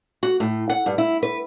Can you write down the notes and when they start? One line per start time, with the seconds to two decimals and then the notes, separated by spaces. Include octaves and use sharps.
0.23 F#4
0.40 A2
0.69 F#5
0.86 G2
0.98 E4
1.23 B4